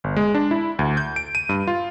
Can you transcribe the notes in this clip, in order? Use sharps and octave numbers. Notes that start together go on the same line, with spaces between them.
G1
G#3
D4
E4
D2
G6
D7
D#7
G2
F4